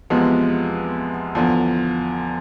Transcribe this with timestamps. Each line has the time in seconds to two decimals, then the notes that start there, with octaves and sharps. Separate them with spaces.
0.10 E2 C3 F3 G#3 B3
1.35 E2 D3 F3